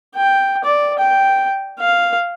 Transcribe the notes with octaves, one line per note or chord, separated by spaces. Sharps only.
G5
D5
G5
F5